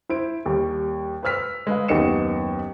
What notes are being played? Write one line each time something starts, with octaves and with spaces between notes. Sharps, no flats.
E4 C5 D7
D#2 G3
B4 C5 E6 F6 B6
G#3 B4 F5
F#1 D#2 B3 D#4 C#7 E7